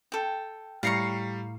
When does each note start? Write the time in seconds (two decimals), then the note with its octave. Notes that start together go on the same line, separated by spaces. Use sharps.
0.12 A4 G5
0.83 A2 G3 F5 A#5 C#6 C7 C#7